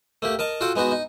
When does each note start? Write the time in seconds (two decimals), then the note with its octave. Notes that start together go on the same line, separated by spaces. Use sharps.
0.22 A3 A#3 G4
0.39 A#4 D#5 A5
0.61 F4 F#4 A4 F#5 G5
0.76 G#3 B3 D#4 F#4
0.92 D#4